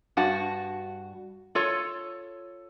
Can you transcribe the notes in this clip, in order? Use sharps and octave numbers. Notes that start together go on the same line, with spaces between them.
G2 F#4 A5
F4 A4 C#5